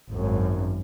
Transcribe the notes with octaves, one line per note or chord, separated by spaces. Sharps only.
G#1 F#2